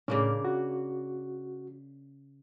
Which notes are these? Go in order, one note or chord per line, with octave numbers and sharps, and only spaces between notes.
A2 C#3 A#3 C#4 D4
F#4